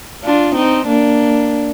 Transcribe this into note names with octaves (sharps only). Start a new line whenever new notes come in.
D4 F4
C4 D#4
A#3 D4